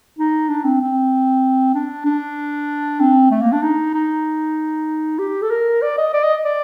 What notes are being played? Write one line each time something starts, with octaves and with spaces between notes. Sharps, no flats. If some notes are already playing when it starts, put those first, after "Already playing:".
D#4
D4
C4
C4
D4
D4
C4
A3
A#3
D4
D#4
D#4
G4
A4
A#4
D5
D#5
D5
D#5
D5